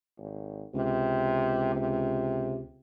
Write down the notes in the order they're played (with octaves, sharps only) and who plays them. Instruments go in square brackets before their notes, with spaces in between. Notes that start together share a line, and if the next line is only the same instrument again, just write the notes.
[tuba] G#1
[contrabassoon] C#2 [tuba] C3
[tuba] C3